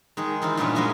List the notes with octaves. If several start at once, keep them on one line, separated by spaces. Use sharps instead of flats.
D#3 G#3 G#4
E3 C4 D#4 F4
G2 A#2 E3 G3 B3 C#4
G#3 A#3 C#4 F#4 D#5 E5